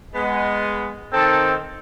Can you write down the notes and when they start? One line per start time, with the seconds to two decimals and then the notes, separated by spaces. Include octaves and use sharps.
0.14 G#3 B3
1.12 D#3 C4 A4